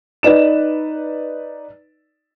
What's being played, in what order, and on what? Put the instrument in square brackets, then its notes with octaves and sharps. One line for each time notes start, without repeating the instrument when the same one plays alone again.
[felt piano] D#4 B4 D5 E7